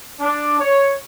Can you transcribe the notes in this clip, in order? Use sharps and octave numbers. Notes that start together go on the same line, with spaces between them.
D4
C#5